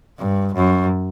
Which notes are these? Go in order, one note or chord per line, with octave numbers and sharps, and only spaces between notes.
G2
F#2